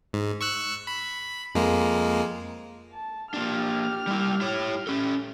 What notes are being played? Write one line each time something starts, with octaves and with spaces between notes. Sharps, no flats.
G#2
C#6 E6 F#6
B5
F2 G#3 A#3
A5
A#3 D4 G4 F6
G3 E4
E4 C#5
C#4 A4